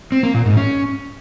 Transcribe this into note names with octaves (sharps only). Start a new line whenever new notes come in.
C4
A#3
A#2
G#2
C#4